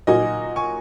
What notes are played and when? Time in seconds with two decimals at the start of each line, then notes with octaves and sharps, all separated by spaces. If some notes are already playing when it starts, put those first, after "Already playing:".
0.07 A#2 F#3 D#4 F#4 A#4 D#5 G#5
0.56 G#5 C#6